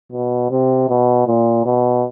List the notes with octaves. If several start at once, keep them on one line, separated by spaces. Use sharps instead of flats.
B2
C3
B2
A#2
B2